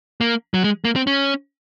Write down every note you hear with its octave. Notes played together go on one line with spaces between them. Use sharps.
A#3
F#3
G#3
A#3
C4
C#4